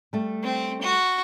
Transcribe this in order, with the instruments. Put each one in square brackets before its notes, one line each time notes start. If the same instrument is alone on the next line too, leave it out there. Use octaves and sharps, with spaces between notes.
[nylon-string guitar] G3 A3
[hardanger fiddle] C4
F#4